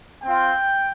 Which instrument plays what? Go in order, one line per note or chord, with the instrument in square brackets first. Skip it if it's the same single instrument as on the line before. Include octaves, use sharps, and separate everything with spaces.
[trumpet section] C4 F4 G5